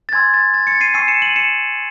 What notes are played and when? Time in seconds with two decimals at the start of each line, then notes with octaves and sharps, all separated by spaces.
0.09 A6
0.13 G#5 C6 E6 G#6
0.34 A6
0.54 A6
0.67 A6 C#7
0.80 C7 D#7
0.94 G#5 C#6 E6 C7 D#7
1.08 C#7 E7
1.22 D#7 F#7
1.36 C#7 E7